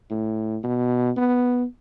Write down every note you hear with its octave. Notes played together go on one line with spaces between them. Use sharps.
A2
B2
B3